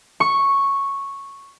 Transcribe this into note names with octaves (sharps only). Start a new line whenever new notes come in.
C#6